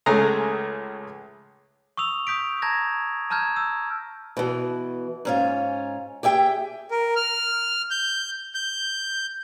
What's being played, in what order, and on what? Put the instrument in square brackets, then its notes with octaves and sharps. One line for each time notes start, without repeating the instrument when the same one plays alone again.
[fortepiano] C#2 G#3 A3 C#4 G#4 A#5
[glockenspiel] C#6 D#6 E6 F7
D#6 G6 B6 D7
A5 A#5 G6 G#6 A#6
A5 A#5 F6 G6 G#6
E6
[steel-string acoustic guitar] B2 E3
G#2 C#4 F4
G4 G#4 E5 G5
[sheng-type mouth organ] A#4
F6
G6
G6